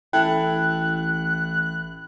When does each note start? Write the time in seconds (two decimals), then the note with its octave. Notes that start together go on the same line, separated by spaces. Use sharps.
0.13 A1 E4 A4 G5 F#6